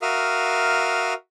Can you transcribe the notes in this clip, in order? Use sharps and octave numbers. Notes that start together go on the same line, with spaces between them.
F#4 A#4 E5 F5 D#6 F6